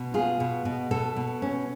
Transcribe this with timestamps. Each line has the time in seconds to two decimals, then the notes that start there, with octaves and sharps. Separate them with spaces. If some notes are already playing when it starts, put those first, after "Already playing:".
Already playing: B2
0.14 F4 G#4
0.40 B2
0.65 B2
0.91 B2 A4
1.16 B2
1.42 C#4